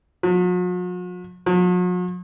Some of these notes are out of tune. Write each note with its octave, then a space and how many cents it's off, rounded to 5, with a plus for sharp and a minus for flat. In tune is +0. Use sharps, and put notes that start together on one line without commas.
F#3 -45
F#3 -45